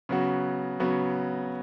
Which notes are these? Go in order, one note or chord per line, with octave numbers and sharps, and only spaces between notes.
C#3 F#3 B3 F#4
C#3 F#3 B3 F#4